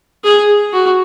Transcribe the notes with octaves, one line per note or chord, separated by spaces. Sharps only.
G#4
F#4